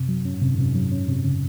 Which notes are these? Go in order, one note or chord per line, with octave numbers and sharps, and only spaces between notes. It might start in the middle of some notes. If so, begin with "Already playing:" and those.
Already playing: F#2 C3
F#3
F#2 C#4
G#2
F#2 C3
G#2
F#2 C3
G#2
F#2 F#3
C#4
C3
C#3